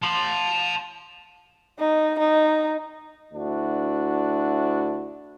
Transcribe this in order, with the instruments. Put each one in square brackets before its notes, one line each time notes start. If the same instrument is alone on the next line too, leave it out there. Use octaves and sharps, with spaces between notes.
[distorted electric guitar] A5 C6
[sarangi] D#4
D#4
[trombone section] D2 D4 E4 F#4